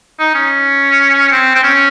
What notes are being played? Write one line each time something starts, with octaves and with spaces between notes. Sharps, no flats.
D#4
C#4
C4
C4
C#4